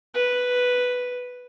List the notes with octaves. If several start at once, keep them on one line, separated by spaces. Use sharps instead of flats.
B4